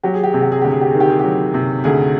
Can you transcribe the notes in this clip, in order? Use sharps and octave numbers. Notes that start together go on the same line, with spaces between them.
F#3 G4
G#4
G4
C3 G#4
G4
G#4
D2 G4
G#4
G4
D#3 G#4
G4
G#4
F#3 G4
C3
D2 G#4